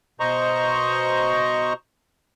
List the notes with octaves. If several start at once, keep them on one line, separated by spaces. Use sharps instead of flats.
B2 C5 D#5 A#5 C#6